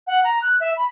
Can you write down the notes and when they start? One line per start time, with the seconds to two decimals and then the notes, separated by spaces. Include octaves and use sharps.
0.07 F#5
0.24 A#5
0.42 F#6
0.60 E5
0.77 B5